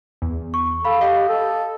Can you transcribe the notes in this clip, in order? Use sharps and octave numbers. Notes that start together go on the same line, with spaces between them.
E2
C#6
A4 F5 B5
G4 D#5 F5
A4